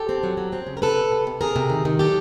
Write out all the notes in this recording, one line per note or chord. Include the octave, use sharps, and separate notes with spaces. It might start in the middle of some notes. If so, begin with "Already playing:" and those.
Already playing: G4 A4
C4
F#3
F#3
C4
C#3
A#4
C3 A4 B4
C3
C3
C3
C3 G#4 A#4
C3
D#3
D#3
F#3 G4 A4